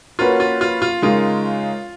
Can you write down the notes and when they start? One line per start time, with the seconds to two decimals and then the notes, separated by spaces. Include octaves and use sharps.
0.19 A#3 C#4 F4 F#4 B4
0.40 F4
0.61 F4
0.82 F4
1.02 C#3 G#3 D#4 F4 A#4